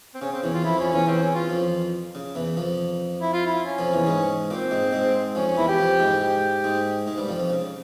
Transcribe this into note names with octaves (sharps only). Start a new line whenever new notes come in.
C4
C#3 C#4
C4
E2 E3 C#4
F4
F2 F3 E4
F2 F3 C#4
E2 E3 C#4
E2 E3 C4
C#4
F4
F2 F3
C#3
E2 E3
F2 F3
E4
F4
E4
C#4
F2 F3
E2 E3
G#2 G#3
A#2 A#3 C4
G#2 G#3
G#2 G#3
F2 F3 C#4
C#4
E2 E3 E4
G4
F2 F3
G#2 G#3
G4
G#2 G#3
G#2 G#3
G2 G3
F2 F3
F2 F3
C#3